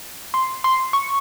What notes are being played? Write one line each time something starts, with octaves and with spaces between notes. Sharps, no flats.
C6
C6
C#6